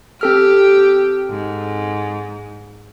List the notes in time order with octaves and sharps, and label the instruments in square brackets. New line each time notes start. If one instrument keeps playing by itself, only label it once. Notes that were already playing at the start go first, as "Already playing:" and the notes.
[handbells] C4 A4 F6 [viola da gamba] G4
[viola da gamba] G#2